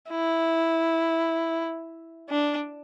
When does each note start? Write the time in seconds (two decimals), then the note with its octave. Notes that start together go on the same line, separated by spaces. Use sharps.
0.11 E4
2.30 D4